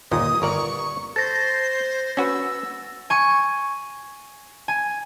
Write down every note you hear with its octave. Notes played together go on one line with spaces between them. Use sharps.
G1 D#2 A#2 D#6
G1 A#4 D5 C#6
A4 C5 A6 A#6
C#4 F#4 B4 E6
G#5 C#6
G#5